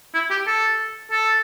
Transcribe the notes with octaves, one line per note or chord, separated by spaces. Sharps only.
E4
G4
A4
A4